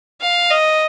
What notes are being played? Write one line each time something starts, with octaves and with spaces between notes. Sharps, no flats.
F5
D#5